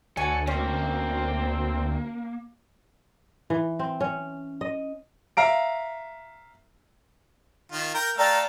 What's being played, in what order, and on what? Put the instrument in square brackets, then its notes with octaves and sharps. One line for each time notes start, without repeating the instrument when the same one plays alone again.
[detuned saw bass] D2 [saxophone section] F#4 C#5 [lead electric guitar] A4 [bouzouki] G#5
[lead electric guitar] A#3 [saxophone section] C4 [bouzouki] C#4
[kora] E3
C4
C#4
D#5
[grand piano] E5 F5 A#5 D7
[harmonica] D#3 F4
A#4 G5 A#5
[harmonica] A3 A4 F5 [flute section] D5 G5 A#5